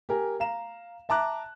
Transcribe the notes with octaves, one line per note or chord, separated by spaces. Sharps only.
G4 A#4 G#5
F5 A#5 E7
E5 A5 A#5 D6 F#6